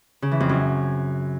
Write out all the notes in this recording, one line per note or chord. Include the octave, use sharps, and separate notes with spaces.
C#3
E3
F2
F#2